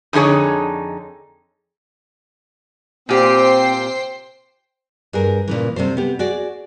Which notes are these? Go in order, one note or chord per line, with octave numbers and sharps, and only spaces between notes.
F2 D3 D#4 G#4 C#5
A#2 C4 G4 C5 G5 C7
G2 G#4 A#4
A#2 C#3 E3
C3 G3 A4 C5
B3 G4
F#4 G#4 D5